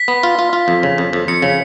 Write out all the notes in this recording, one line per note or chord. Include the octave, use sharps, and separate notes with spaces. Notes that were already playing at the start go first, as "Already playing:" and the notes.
Already playing: B6
B3
F4
F4
F4
F2
C#3
F2
F2
F2 C#7
C#3